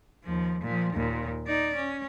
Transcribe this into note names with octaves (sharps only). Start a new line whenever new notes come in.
D#2 F3
A#2 F3
D#2 A#2
D#4 D5
C#4